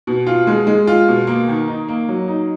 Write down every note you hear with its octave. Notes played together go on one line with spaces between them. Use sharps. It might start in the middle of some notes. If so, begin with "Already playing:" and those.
B2
F4
G#3
G#3
F4
B2
A#3
D#3
D#4
A#3
F#3
D#4